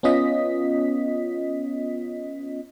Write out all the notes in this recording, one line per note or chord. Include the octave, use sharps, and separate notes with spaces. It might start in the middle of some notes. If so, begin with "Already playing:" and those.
B3 C#4 F4 D#5 B6